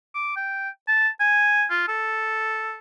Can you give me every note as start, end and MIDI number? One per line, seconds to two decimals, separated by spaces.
0.15 0.33 86
0.36 0.69 79
0.88 1.08 81
1.20 1.64 80
1.70 1.84 65
1.88 2.79 69